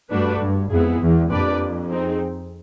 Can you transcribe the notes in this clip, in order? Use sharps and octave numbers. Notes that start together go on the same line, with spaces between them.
G2 A3 D4 F#4 B4
G2
F2 G#3 B3 E4 G#4
E2
F2 A#3 D4 G4 B4 D5
C4 D#4 G#4